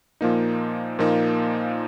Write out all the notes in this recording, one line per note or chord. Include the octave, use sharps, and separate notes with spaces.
A#2 F3 A#3 D#4
A#2 F3 A#3 D#4